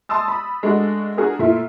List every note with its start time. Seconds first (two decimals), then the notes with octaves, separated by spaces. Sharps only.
0.09 A5 C6 D#6 E6 A6
0.28 B5
0.63 G#3 A3 D4 F#4
1.17 D4 F#4 G#4 A#4
1.39 A#2 A3 E4